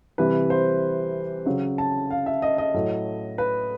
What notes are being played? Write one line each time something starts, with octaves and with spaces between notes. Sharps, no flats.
C3 E3 G3 B4
C5
C#3 F#3
A5
F5
E5
D#5
D#5
A2 F#3
B4